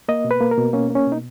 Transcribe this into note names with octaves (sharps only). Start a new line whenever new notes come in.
A#3 D#5
B2
B4
A#3
A#4
B2
A#3 C#4
A#3 C#4
B2
D#4